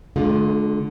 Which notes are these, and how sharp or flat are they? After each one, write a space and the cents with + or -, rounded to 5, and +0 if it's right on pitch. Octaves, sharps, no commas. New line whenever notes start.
D3 +0 G#3 +45 F4 +25